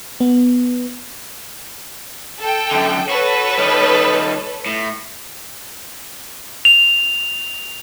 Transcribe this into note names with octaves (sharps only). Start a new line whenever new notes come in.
B3
A4 G5
F#2 D3
F#4 A4 B4 C#5
D#3 G3
A2
F7